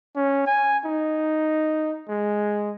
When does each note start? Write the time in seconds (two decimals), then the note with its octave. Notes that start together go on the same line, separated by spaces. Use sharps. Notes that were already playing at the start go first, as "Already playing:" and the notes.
0.16 C#4
0.47 G#5
0.86 D#4
2.09 G#3